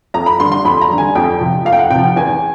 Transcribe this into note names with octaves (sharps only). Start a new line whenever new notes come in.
F2 A#5
B5
D3 G3 C6
C6
F2 B5
A#5
D3 G3
G#5
F2 G5
C3 F3
F2 F5
G5
F#5
C3 F3 G5
G5
E2 G#5